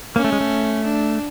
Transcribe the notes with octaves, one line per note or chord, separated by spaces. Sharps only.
A#3 C#4
A3
G#3
A3
D4